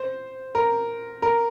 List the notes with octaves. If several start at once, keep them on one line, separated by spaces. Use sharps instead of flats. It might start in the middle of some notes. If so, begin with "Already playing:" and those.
Already playing: C5
A#4
A#4